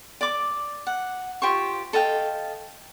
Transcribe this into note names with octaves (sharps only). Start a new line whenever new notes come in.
D5 D6
F#5
F4 G4 C5 C#6
A4 D#5 F5 G5